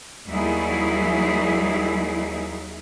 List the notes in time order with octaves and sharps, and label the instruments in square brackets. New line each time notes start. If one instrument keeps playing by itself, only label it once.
[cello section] D#2 F#3 G3 D#4 E4 G#4